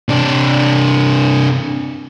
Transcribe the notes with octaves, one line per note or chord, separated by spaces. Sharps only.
C3 D4